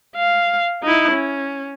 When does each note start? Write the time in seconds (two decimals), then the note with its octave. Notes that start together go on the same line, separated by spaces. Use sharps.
0.15 F5
0.83 D#4 E4
1.12 C#4